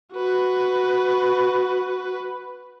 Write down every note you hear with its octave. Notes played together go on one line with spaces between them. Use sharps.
F#4 B4